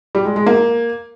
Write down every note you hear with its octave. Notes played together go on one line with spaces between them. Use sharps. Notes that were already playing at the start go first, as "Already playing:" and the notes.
G3
G#3
G#3
A#3